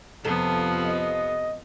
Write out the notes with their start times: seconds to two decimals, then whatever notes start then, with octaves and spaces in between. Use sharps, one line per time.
0.25 F2 C3 F3 B3 A4
0.85 D#5